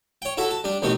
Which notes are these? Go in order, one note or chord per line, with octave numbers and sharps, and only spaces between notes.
C#5 G5
E4 F#4 A4 E5
A5
G3 D4
A1 B2 D#3 C4 G4